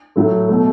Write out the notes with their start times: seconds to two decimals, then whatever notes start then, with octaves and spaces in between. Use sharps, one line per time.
0.16 A2 F#3 A3
0.48 B2 A3